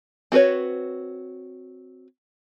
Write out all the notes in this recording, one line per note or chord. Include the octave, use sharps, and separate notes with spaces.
C4 F#4 G#4 B4 C#5